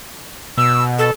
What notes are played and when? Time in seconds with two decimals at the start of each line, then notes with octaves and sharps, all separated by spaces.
0.58 B2 E6
0.99 A4